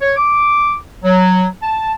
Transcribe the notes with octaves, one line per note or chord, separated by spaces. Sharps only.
C#5
D6
F#3
A5